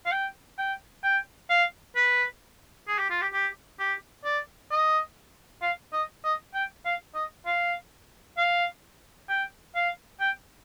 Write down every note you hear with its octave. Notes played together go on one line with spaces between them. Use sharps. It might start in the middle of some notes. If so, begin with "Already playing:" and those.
F5
G5
G5
G5
F5
B4
G#4
G4
F4
G4
G4
G4
D5
D#5
F5
D#5
D#5
G5
F5
D#5
F5
F5
G5
F5
G5